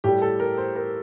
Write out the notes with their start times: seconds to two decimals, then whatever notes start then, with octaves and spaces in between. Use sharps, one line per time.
0.04 A2 G3 G4
0.22 A4
0.40 A#4
0.58 C5
0.76 A#4